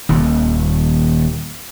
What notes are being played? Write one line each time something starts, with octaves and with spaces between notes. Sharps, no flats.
D#1 D#2